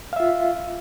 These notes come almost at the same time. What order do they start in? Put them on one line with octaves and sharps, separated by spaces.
F5 E5 F4